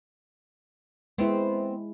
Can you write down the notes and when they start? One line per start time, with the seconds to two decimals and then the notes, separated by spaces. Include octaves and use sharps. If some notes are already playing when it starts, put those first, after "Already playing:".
1.18 G#3 B3 C4 E4